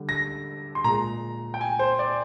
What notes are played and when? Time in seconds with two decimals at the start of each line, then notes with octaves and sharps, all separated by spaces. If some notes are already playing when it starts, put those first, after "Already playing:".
Already playing: D3 G3
0.09 A#6
0.75 C6
0.84 A#2 G#3 A#5
1.54 G5
1.61 G#5
1.79 C5
1.99 D5